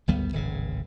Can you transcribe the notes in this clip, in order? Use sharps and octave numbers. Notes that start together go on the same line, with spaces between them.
G#1 D2 G3 B3
D1 G#1 C#3